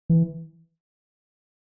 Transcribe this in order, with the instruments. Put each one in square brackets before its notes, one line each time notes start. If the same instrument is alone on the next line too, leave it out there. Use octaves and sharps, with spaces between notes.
[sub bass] E3